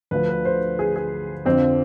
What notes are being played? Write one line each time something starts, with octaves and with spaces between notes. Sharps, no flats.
D2 D3 F3 B4
B4
C5
G#4
G#4
F2 D3 F3 C4